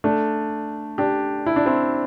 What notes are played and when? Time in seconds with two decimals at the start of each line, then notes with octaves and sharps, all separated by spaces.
0.04 A3 D4
0.98 D4 G4
1.46 E4
1.56 D4
1.66 C4 E4